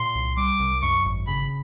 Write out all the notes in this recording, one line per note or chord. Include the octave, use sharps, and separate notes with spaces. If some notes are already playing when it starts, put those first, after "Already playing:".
Already playing: A#2 C6
C2
G3 D6
C2
F#2 C#6
G#1
C#3 B5